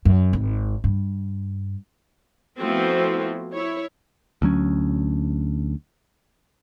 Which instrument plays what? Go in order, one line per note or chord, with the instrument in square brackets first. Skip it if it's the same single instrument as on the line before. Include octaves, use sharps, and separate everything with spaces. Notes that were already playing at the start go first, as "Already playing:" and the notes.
[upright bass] F#2
G#1
G2
[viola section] F3 A3 B3 C4 E4 F#4
E4 C#5
[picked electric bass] D2 F#3 C#4